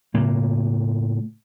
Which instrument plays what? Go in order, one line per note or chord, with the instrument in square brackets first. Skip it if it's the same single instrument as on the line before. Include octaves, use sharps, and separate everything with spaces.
[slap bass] A2 C#3 A#3